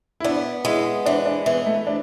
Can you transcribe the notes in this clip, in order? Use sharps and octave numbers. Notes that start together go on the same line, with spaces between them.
E4
B3 D4
G#3 E4
E3 D4
D4
E3 B3
A3
D4